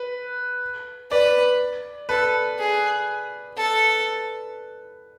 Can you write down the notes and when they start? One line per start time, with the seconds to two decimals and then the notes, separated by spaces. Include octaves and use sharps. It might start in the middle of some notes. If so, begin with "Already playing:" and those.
Already playing: B4
1.11 B4 D5
2.09 A4 B4
2.59 G#4
3.57 A4